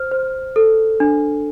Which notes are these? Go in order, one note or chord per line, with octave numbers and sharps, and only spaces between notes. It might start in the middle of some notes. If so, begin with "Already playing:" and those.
Already playing: C5 F6
C5
A4
D4